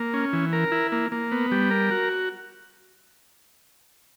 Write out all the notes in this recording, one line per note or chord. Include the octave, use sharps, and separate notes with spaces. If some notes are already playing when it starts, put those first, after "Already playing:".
Already playing: A#3
C#4
E3
A#4
E4
A#3
A#3
B3
G3
A#4
F#4